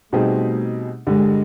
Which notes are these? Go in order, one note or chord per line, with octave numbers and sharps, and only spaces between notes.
B2 G3 A3 C4 D#4 G#4
G2 D3 G3 G#3